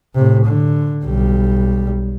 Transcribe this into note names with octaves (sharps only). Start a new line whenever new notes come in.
A2 C3
D3
B1 G3